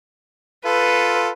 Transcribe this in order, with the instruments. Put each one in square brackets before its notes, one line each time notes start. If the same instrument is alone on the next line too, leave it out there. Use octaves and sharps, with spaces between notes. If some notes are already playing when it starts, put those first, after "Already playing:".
[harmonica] F4 A4 [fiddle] B4